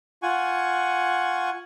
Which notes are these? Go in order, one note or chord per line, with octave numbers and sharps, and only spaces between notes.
F4 F#5 G#5 C#6